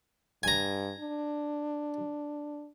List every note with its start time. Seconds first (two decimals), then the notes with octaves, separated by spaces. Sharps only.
0.43 G2 G#5 A#5
1.00 D4